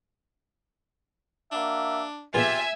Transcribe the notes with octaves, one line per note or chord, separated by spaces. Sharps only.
A#3 D4 F#4 E5
A#2 B3 F4 G4 G#4 E5 G#5